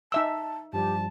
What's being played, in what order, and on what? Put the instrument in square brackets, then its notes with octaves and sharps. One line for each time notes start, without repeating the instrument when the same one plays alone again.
[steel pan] D#4 E5 E6 [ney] A5
[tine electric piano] G2 F3 G3 [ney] G4 [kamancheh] A5